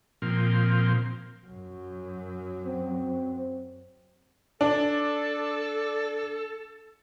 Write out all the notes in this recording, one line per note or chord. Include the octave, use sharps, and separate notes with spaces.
A#2 F3 C4
F#2 F#3
C4
D4 A4